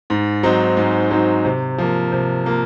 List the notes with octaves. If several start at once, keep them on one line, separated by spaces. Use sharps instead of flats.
G#2
F#3 C4 D#4
G#2
F#3 C4 D#4
C3
F3 A#3
C3
F3 A#3